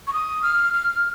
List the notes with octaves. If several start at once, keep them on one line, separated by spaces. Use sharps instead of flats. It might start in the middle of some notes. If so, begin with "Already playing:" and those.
C#6
D#6
F6
F6